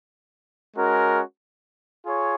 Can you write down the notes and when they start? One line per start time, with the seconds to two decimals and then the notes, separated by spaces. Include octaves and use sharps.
0.76 G#3 C#4 F#4 A#4
2.06 F4 G#4 C#5